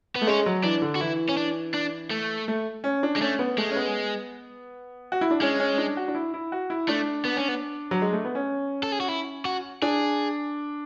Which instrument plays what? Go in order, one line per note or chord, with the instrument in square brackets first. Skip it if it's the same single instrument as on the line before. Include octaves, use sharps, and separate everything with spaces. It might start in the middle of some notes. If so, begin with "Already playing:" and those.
[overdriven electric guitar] B3
[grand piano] A3
[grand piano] G#3 [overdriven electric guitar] C#4
[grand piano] F#3
[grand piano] E3 [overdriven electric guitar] D4
[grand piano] D3
[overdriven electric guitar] F#4
[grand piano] E3 [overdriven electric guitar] E4
[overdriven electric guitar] C#4
D4
D4
A3
[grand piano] A3
C#4
D4
[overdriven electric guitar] G#3
[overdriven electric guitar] A3 [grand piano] C#4
[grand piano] B3
[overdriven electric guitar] G#3 [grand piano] A3
[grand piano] C#4
B3
F#4
E4
D4
[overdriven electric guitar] G#3 [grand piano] C#4
[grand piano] C#4
D4
F#4
D4
E4
E4
F#4
E4
[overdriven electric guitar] A3 [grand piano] D4
[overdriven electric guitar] B3
C#4
B3
[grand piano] F#3
G#3
A3
B3
C#4
[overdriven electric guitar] A4
G#4
F#4
E4
F#4
[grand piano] D4 [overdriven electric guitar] G#4